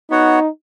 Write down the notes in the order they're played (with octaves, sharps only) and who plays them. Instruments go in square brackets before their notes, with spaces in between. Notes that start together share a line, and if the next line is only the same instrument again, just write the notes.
[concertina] B3 F#4 C#5 F#5 [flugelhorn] D#4